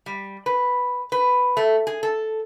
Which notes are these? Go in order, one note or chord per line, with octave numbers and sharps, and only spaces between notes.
G3
B4
B4
A3
G#4
A4